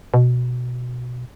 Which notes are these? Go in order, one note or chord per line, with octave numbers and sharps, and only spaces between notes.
B2